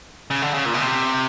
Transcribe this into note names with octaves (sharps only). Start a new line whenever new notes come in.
C#3
D3
C#3
A#2
B2
C3